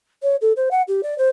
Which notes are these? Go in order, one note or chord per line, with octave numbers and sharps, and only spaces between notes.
C#5
A4
C5
F#5
G4
D5
C5